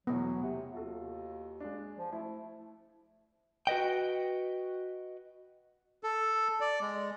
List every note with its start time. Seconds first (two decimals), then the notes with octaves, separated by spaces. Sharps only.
0.07 E2 B2 F#3 A3 B3
0.43 C3 F#5
0.74 D#2 F4 F#4 A4
1.60 G#3 D4
1.99 F3
2.13 A3 E4
3.67 F#4 B4 D#5 G5
6.03 A4
6.60 D5
6.81 G#3